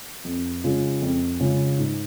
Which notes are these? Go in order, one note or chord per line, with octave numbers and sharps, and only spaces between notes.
F2
C#3 G#3 C#4 F4
F2
C#3 G#3 C#4 F4
G#2